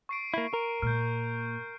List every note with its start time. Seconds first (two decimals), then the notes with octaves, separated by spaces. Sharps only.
0.09 C#6 C7 D7
0.34 A#3 E4
0.54 A#4
0.82 A#2 F6 G6